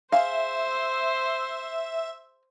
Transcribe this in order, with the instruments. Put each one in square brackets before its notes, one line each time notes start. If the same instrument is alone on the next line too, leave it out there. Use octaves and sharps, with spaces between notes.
[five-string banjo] G#4 F5 [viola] C5 [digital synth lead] E5